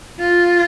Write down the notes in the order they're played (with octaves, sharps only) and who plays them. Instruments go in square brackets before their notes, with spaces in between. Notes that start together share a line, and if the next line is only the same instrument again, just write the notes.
[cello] F4